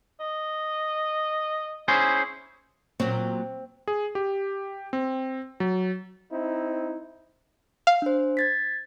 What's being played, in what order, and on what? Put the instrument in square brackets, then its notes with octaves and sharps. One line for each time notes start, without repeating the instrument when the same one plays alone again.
[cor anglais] D#5
[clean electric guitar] C#4 G#4 C5 [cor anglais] E4
[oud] A#2 F#3 [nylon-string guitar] C4
[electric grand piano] G#4
G4
C4
F#3
[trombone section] C4 D#4 E4
[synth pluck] F5
[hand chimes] D4 C5
G#6 A6 B6